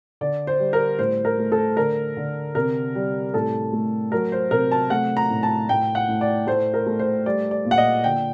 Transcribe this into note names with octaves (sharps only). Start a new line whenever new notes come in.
D3 D5
C5
G3
A#4
A2 C5
A#4
A3
A4
D3 A#4
D3
C3 A#4
G3
A2 A4
A3
F#3 A#4
C5
C3 A#4
A5
A3 F#5
A#5
A2
A5
A2 G5
F#5
A2
D5
A3 C5
A#4
A3
C5
G3 D5
D5
A#2
F#5
D#5
D3 G5